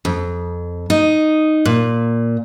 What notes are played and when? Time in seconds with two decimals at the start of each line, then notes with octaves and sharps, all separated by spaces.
0.05 F2
0.90 D#4
1.65 A#2